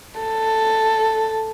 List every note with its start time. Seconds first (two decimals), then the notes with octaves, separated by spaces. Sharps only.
0.20 A4